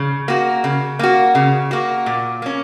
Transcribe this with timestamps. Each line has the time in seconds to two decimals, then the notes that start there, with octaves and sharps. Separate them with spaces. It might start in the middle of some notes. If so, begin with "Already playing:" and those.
Already playing: C#3
0.28 A#3 F#4
0.64 C#3
0.99 A#3 F#4
1.35 C#3
1.71 A#3 F#4
2.06 A#2
2.42 A#3 C#4